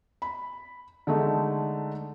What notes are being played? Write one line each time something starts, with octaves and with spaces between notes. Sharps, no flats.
B5
D3 G#3 A3 D#4